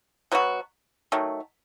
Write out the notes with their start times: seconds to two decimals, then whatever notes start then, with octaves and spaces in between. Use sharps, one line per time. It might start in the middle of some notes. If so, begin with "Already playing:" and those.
0.32 B2 F#3 B3 F#4
1.12 D#3 F#3 A3